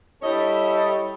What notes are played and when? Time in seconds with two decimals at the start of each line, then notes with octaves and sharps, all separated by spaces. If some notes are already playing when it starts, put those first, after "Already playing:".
0.22 G3 E4 A4 C#5 D#5